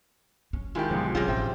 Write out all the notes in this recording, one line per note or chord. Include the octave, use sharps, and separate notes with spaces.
C#4
D#3 G#3 E4 F4 G4
B1 G#2 D3 F3 G3
C3 F#3 G3 C#4 F4 G#4
A1 E2 C5 E5 G5